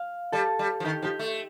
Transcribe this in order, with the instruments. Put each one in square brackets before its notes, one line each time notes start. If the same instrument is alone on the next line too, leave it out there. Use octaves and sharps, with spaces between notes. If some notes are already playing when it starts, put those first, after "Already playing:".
Already playing: [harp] F5
[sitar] G3 [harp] A4
[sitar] G3
F3
[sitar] D#3 [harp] G4
[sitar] F3 [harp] G4
[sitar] A3